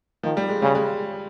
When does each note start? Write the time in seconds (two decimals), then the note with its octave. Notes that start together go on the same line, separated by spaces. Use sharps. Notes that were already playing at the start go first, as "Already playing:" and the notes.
0.23 D#3 F3
0.37 G3
0.49 G#3
0.62 C#3 G3
0.75 G#3